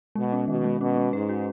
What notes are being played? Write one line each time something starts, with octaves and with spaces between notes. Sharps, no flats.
B2 G#3
C#4
B2 D#3
G#3
B2 C#4
C#4
G#2 B4
F#4